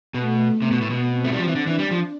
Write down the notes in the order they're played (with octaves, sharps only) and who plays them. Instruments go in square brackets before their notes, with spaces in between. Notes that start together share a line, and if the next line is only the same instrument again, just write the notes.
[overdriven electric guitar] B2 [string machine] A3
[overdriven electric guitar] C3 [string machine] B3
[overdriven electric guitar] B2
A2
B2
[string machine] C4
[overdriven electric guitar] A3
G3
F3
E3
[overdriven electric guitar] D3 [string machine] D4
[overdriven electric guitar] E3
G3
F3